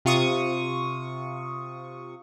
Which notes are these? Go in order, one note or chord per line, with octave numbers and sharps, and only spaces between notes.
C3 F4 C#6 D#6